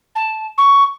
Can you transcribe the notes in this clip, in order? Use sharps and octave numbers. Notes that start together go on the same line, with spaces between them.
A5
C#6